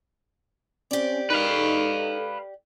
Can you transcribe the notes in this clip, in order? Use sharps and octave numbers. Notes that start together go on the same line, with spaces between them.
C4 C#4 G4 C5 D5
D#4 A#4 B4 F5
A4